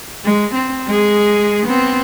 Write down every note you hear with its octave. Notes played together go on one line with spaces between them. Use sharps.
G#3
C4
G#3 G#4
B3 C4